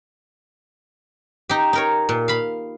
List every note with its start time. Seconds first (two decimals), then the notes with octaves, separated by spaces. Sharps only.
1.49 D#4 G4
1.73 D#4 A#4 C#5
2.09 A#2
2.28 F5 B5